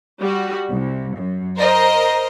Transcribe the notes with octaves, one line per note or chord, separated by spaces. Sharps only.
G3 F#4
C2
F#2
A#4 C5 D#5